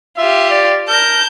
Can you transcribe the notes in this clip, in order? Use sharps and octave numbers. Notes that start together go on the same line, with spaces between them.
F4 G4 E5
D5
A#4 A5 G6